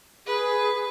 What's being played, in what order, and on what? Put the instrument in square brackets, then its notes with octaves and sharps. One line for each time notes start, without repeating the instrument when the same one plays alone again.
[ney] G#4 [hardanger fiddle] B4